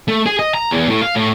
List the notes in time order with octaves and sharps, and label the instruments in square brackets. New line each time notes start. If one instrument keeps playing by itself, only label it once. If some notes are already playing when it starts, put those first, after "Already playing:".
[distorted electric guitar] A3
G#4
D#5
A#5
E2
A2
F5
A2